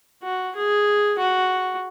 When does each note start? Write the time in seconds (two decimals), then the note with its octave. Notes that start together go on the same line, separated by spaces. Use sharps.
0.23 F#4
0.55 G#4
1.19 F#4